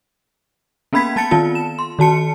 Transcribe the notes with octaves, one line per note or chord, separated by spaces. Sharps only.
A#3 B3 C#4 B5 G#6 B6
B3 A5 A6 C#7
D#3 B3 C4 F4 A5
E7
C6
D#3 F#4 A5 C#7